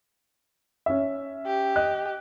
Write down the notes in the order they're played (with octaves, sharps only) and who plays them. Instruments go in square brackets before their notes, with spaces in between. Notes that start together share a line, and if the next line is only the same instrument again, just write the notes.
[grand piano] C#4 E5
[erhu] G4
[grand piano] D#5 F#6